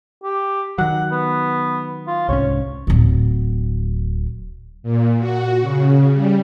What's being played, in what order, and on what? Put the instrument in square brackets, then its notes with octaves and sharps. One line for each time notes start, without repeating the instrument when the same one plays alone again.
[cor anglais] G4
[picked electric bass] D#3 F#3 [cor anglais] F#5
[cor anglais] B3
F4
[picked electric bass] C2 G#2 C#4 [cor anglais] C#5
[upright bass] D1 F#3
[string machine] A#2
F#4
C#3
G3